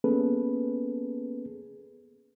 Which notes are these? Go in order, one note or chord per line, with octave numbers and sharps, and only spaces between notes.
A#3 B3 C#4 G#4 A4 B4